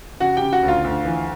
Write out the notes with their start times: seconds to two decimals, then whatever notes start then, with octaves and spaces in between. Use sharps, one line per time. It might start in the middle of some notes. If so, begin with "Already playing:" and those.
0.20 C#3 F#4 F#5
0.37 G4 G5
0.42 C#3
0.53 F#4 F#5
0.63 D2
0.68 F4 F5
0.84 D2
1.05 E3